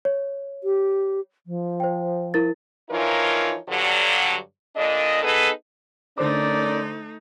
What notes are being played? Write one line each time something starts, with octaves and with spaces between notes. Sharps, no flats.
C#5
G4
F3
C5 G5
E4 A#4 A6
E3 F3 D#4 F4 A#4 C#5
G2 D3 F#3
A#2 D3 D4 D#5
B3 D#4 G#4 A4 B4
D3 A3 C#4 D#4 A#4 C5 D5 D6